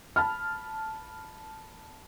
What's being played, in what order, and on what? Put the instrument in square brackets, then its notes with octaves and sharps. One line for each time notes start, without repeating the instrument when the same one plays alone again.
[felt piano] A5 B5 F6